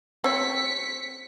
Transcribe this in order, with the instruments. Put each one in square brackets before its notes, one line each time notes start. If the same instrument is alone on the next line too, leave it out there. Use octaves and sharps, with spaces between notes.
[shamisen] C4 C#5 [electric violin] B6 C#7